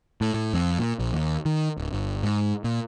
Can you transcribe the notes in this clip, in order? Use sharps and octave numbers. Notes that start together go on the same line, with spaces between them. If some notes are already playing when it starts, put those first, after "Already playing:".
A2
A2
F2
A#2
A#1
D#2
D#3
D1
G1
G#2
A#2